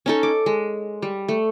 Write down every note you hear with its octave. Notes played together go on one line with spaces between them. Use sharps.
C#4 D#4 A4
D6
G#3
G3
A3